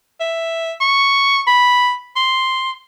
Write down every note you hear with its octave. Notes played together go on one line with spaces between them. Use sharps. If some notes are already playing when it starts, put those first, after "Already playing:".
E5
C#6
B5
C6